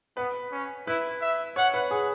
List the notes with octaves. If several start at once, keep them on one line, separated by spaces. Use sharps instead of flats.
B3 B4
C#4
E4 B4
E5
C#5 F#5
B4
G#4